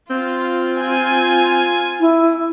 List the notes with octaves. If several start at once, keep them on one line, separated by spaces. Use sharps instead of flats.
C4 F4
F4 G#5
E4